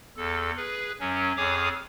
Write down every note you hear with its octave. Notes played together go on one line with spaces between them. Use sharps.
E2 A4
G#4 B4
F#2 F#3 C#4
F2 G#4 C#5 G#5 D6 D#6